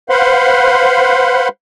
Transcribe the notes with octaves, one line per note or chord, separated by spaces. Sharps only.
B4 C5 F5 F#5 B5 C6